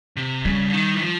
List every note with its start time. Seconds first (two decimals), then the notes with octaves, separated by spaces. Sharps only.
0.17 C3
0.45 C#3 G3
0.68 D3
0.74 D#3
0.94 E3
1.02 F3